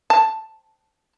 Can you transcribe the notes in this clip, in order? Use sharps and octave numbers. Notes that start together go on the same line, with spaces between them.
A5